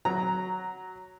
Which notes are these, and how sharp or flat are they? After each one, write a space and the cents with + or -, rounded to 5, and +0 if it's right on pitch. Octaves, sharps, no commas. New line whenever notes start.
F#3 +0 A#5 +0